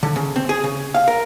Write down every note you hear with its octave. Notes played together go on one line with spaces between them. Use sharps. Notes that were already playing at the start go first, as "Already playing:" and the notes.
D3
C#3
C4
G#4
C#3
F5
A#4